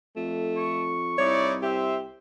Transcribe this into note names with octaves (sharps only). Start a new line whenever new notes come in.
F2 A3
C#6
C2 D#4 E4 C#5 D5
G4 C5 E5